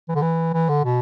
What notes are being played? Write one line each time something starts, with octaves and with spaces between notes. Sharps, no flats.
E3
D3
E3
E3
D3
B2